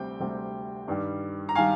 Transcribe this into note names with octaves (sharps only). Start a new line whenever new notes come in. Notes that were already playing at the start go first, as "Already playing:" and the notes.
Already playing: D2 C3 G3 C4 G5
D2 C3 G3 C4
G2 D#3 G3
A#5
D#3 G3 F5 G#5